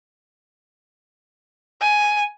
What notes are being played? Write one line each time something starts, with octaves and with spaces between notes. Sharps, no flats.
G#5